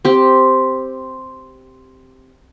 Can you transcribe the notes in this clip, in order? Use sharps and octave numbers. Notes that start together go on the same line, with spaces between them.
C4 G4